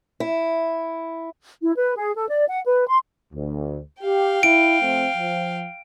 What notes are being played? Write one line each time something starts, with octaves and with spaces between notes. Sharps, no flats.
E4
E4
B4
G#4
A4
D5
F#5
B4
C6
D2
G4 F5 G5
E4 D7
F3 A3 C4
F3